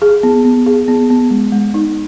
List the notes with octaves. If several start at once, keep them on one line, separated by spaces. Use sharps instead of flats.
G#4
B3
B3
G#4
B3
B3
G#3
G#3
D#4